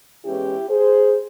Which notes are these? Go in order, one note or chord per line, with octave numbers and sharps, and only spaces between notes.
E2 E3 G#3 C#4 E4 G4
G#4 C5